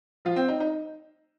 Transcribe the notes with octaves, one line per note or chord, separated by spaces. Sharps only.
F3 F4
C4
D#4
D#4